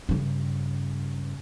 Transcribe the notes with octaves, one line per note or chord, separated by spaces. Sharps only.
G2 C#3